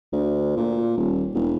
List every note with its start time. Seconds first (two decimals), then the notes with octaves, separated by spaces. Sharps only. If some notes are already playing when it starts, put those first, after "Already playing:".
0.12 D2
0.57 A#2
0.97 D#1
1.34 E1